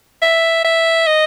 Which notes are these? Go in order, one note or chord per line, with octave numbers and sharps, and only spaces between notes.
E5
E5
D#5